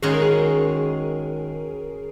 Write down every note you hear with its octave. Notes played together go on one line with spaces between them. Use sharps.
D#3 G#3 C#4 F#4 G#4
A#4
G#4